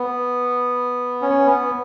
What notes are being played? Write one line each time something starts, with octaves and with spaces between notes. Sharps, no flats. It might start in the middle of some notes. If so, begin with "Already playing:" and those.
Already playing: B3
C#4
B3